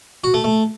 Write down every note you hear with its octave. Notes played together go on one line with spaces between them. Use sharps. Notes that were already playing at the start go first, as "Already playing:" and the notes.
F#4
A3
A3